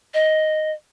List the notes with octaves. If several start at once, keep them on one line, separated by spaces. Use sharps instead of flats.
D#5